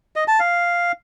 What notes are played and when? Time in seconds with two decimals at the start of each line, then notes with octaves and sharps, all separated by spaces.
0.16 D#5
0.28 A5
0.40 F5